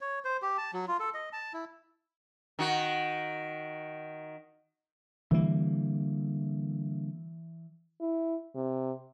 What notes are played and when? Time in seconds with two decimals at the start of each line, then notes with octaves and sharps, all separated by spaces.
0.01 C#5
0.25 C5
0.42 G4
0.58 A5
0.74 F#3
0.88 F4
1.00 A4
1.14 D#5
1.33 A5
1.53 E4
2.59 D#3 F#4
5.31 D3 E3 G3 A#3
8.01 E4
8.55 C3